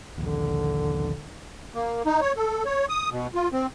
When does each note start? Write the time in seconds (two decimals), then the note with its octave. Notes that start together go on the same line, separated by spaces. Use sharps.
0.18 A#1 D#2 D3
1.74 A#3
2.06 D#4
2.21 C#5
2.36 A4
2.65 C#5
2.89 D#6
3.10 B2
3.34 F4
3.52 C4